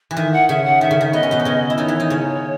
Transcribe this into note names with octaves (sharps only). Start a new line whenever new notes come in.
E3
D#3 E5
F#5
C#3 E5
F#5
D#3 E5
C#3
D#3
B3 D#5
C#4
B2 B3
D#4
C#3 C#4
E4
D#3 D#4 C#5
E3 E4
D#3 D#4
C#3 C#4